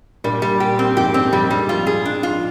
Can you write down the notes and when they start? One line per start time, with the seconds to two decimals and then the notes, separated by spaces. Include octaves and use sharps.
0.24 G2 A#2 G3
0.42 G3
0.60 G4
0.79 C4
0.97 F2 G#2 G4
1.14 G2 C4
1.33 F2 G3
1.50 G2 G3
1.69 F2 G#2 F4
1.87 G#4
2.05 D4
2.23 F4